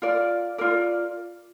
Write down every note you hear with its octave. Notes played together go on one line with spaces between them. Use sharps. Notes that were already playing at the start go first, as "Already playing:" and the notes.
F4 A#4 D5
F4 A#4 D5